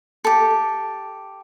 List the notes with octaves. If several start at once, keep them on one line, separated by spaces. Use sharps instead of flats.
G4 A4